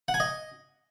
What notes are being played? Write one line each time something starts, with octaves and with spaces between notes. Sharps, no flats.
F#5
G#5
D#5